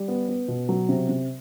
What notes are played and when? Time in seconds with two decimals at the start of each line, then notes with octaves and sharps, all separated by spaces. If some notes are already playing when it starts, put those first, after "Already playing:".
Already playing: G3
0.08 B3
0.28 B3
0.48 B2
0.69 F#3
0.89 C3
1.09 C3